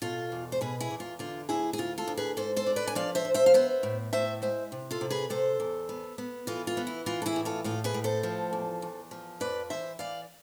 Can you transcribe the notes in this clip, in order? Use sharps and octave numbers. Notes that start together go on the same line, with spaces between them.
B2 F4 A4
E2
C5
B2 G#4 B4
E4 G#4
E2
F4
D3 F4
D2 E4 G#4
G#4
D2 F4
F4 A4
D2
G#4 B4
G#2 A4 C5
A4 C5
D4
B4 D5
G#5
F3 D5 F5
C5 E5
F3
C5 E5
F5
B3 C5 E5
A2
A2 C5 E5
G#3 C5 E5
C3
F4 A4
C3
G#4 B4
C3 A4 C5
E2
B3
B3
E3 F4 A4
F4
B3
E4
E3 F4
A4
E4 G#4
A2
F4 A4
A2 F4 A4
G#4 B4
A2
A4 C5
F3
E2
E2
F3
F2 B4 D5
E3 C5 E5
E3 D5 F5